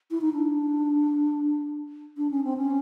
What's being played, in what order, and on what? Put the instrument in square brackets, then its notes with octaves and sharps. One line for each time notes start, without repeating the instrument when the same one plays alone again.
[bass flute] E4
D#4
D4
D4
C#4
C4
C#4